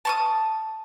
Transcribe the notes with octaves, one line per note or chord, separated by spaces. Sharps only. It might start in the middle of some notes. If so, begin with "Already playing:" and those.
A5 C#6 D#6